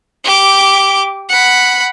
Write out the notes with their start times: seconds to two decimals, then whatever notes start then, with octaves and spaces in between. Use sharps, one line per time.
0.24 G4 D6
1.29 F#5 B5